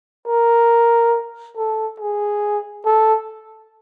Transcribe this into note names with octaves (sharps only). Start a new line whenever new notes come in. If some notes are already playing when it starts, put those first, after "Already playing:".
A#4
A4
G#4
A4